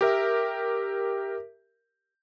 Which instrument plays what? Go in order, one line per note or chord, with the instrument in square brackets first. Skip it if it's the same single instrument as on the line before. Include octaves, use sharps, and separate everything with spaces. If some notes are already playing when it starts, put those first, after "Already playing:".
[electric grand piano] G4 A#4 E5